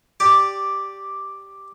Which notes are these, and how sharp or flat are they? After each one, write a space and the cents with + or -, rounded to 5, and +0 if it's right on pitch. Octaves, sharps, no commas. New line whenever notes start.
G4 +0 D5 +0